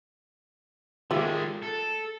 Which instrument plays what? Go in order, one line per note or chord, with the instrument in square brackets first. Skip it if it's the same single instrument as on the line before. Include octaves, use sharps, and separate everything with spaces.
[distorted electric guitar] D#3 G#3 [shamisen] A3 F4 G4
[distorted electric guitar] A4